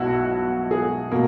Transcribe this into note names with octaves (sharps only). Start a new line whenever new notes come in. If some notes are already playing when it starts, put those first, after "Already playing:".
Already playing: B1 B2 B3 E4 F#4
G#4
B2 A#3